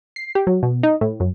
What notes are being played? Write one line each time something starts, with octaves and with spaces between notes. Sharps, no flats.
C7
G4
F#3
B2
D#4
A2
F#2